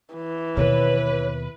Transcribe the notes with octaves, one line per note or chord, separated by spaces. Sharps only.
E3
D#2 B2 B4 C#5